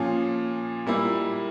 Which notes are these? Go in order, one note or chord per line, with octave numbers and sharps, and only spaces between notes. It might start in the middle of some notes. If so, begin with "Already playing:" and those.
Already playing: A#2 F3 C#4 F4
A#2 G3 A#3 E4